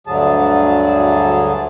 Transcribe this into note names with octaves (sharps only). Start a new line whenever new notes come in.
D2 G2 D3 F#3 G#4 A5